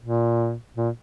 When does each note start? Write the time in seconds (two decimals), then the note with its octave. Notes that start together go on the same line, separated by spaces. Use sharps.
0.02 A#2
0.76 A#2